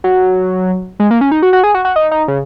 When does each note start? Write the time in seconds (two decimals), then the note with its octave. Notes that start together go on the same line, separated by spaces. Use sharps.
0.04 F#3
1.00 G#3
1.11 A#3
1.21 C#4
1.32 D#4
1.43 F#4
1.53 F#4
1.64 G#4
1.74 F#4
1.85 F#4
1.96 D#4
2.11 D#4
2.28 C#3